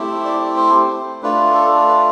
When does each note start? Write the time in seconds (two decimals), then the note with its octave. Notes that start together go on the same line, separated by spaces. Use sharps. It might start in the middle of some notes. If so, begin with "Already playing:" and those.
Already playing: A3 C4 E4 G4
0.25 D5
0.57 C5
1.23 A3 D4 F4 B4
1.54 A4
1.88 B4